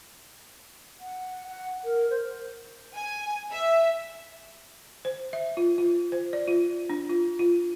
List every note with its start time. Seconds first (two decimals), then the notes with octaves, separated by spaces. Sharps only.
1.00 F#5
1.47 F#5
1.85 A#4
2.10 C5
2.94 G#5
3.52 E5
5.05 C5
5.33 E5
5.57 F4
5.78 F4
6.12 C5
6.33 D5
6.48 F4
6.90 D4
7.09 F4
7.39 F4